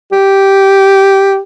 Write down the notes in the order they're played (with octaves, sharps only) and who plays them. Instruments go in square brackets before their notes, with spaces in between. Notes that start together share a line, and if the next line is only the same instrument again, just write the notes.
[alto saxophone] G4